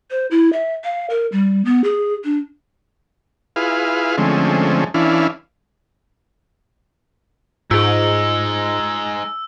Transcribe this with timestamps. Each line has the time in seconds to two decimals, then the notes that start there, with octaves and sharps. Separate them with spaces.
0.11 C5
0.31 E4
0.53 E5
0.84 F5
1.10 A#4
1.32 G3
1.65 B3
1.84 G#4
2.24 D4
3.56 E4 F4 G#4 B4 F5
4.18 D3 F3 G#3 A3 C4 C#4
4.94 E3 C#4 D4 E4 F5
7.71 G#2 G#3 D#4 F4 G#4 E6